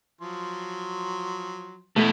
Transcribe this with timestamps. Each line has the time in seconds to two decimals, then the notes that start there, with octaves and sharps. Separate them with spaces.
0.21 F3 F#3 C6
1.96 B2 E3 A3